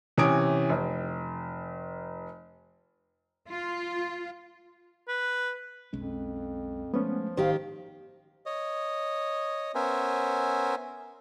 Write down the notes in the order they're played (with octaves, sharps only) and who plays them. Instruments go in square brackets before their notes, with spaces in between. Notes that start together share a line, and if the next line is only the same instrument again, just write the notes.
[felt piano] C3 E3 C#4 G#5 D#6 D7
F1
[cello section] F4
[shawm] B4
[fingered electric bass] B1 G#3 C#4 [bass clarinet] F2
[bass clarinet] F3 [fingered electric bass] G#3 A3 [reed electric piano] B3 C#4
[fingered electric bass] G#1 [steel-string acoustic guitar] D#3 G4 [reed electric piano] C5 F5
[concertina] C#5 D#5
B3 C#4 A#4 C5 E5 G#5